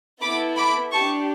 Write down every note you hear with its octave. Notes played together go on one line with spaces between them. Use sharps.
B3 E4 A4 B5 D6
B5 D6
D4 G4 A5 C#6